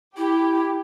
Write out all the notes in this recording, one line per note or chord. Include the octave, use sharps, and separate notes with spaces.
E4 G4